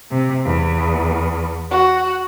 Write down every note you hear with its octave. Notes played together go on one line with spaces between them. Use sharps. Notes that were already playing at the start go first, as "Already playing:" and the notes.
C3
E2
F#4